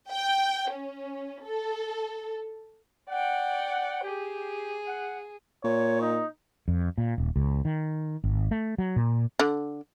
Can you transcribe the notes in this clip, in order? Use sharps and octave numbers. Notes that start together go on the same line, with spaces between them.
G5
C#4
A4
D5 F#5 G5
G4 G#4
F#5
A#2 C#5
D#4
F2
A#2
D#1
C#2
D#3
G#1
A3
F#3
A#2
D3